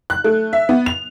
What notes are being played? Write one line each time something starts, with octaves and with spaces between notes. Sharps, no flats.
F#6
A3
E5
B3
F7